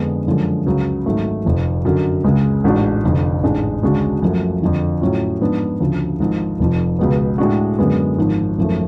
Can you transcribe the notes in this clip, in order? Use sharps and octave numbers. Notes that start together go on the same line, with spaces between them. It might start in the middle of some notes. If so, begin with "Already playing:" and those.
Already playing: F2 D3 G#3 B3 D4
F#2 D3 F3 G#3
C#2 C#3 F#3
G#1 G#2 F#3 A3
F1 F2 F3
F#2 D3 F#3
C#2 C#3 G#3
A1 G#2 G#3 D4 F#4
F1 F2 D3
A1 G#2 G#3 D4
D2 C#3 G#3 D4 F#4
F#2 F3 A3
F2 D3 F3
A2 F#3 C#4 F4
G#2 F3 B3 D4
D2 C#3 F3
G#1 G#2 F3
F1 F2 F3
C#2 B2 G#3 B3
A2 G#3 D4 F#4
F#2 D3 G#3 B3
G#1 G#2 F3
G#1 F#2 F3 A3